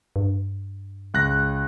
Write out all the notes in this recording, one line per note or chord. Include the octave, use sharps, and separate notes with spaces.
G2
C#2 F#6 A#6